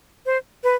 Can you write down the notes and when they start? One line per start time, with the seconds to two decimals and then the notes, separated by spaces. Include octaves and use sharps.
0.26 C5
0.64 B4